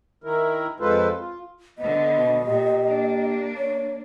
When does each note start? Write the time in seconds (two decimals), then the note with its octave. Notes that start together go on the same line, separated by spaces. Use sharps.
0.24 D#3 E4 A#4
0.80 F2 G#3 F4 A4 B4 C5
1.20 F4
1.78 D3 B3 D#5
2.17 B2
2.46 A#2 G4
2.88 A#3 D4
3.57 C#5